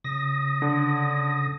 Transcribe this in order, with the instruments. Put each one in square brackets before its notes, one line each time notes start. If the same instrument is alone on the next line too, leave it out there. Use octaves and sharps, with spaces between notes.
[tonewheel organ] C#3 D#6 A#6
[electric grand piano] D3